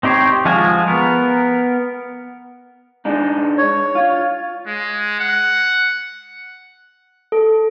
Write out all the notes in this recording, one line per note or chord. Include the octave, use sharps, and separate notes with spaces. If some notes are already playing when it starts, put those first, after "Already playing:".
C4 D#4 G4 C5 C#5
F3 G#3 F4 F#4 G#5
B3 A#4
G#3 D4 D#4
C#5
F4
G#3
F#5
A4